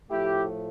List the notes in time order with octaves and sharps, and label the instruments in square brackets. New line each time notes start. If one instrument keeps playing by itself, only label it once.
[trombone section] A2 F3 A3 E4 G4